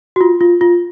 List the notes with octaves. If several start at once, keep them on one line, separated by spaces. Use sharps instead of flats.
F#4
F4
F4
F4